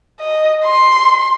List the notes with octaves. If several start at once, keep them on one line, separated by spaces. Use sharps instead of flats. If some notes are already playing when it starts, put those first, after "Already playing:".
D#5
C6